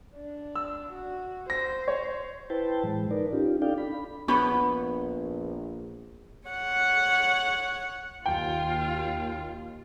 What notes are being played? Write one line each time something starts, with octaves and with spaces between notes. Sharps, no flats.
D4
E6
F#4
C5 A#6
C#5
E4 B4 C5 G5 A5
A2 E3 G#3
D#4 A#4 B4 D5
C#4 D#4 F4 G4
D4 D#4 A4 D5 F5 G5
D4 B5
A#1 B3 D4 G#4 C#5 B5 C#6
C#5 F#5
D#2 F4 G5